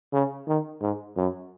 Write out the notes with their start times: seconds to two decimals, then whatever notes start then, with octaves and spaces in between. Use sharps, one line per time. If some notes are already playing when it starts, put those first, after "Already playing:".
0.13 C#3
0.47 D#3
0.81 G#2
1.17 F#2